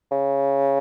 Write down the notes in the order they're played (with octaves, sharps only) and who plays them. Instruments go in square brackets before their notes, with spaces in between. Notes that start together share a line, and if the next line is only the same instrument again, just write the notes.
[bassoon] C#3